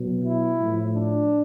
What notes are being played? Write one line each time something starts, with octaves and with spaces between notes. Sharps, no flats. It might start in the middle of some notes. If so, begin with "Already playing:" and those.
Already playing: B2 F#3
E4
A2 F3
D4